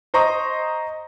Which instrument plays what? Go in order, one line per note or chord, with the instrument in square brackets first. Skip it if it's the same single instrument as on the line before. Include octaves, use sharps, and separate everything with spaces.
[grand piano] C5 D#5 A#5 C6 C#6 D#6